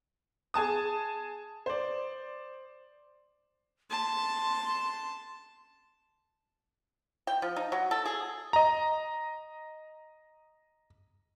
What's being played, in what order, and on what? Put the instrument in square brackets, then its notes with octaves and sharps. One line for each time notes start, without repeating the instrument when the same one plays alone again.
[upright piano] G#4 G#5 A5 D#6
C5 D5
[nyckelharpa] A5 [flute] C6
[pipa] G5
F3
D#4
F#3
A4
G#4
[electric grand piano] D#5 A#5